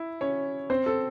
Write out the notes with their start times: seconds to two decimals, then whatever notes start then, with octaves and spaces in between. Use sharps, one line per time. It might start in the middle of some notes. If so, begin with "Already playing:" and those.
Already playing: E4
0.21 C#4 C#5
0.70 C4 C5
0.86 A4